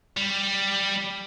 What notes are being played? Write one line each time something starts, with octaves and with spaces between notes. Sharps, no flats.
G3